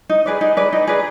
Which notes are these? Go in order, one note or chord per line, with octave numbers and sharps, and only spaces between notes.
D#4
G#4 B4 D5
D#4
G#4 B4 D5
D#4
G#4 B4 D5